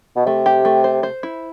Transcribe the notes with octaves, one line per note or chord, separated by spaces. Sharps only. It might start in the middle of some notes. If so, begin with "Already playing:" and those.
B2
C3 A3
G4
A3
C5
C5
E4